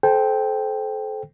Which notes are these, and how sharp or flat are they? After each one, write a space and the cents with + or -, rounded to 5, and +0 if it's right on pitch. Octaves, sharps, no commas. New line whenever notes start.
A4 -30 C5 -5 G5 +0